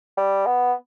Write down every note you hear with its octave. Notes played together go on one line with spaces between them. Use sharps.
G3
B3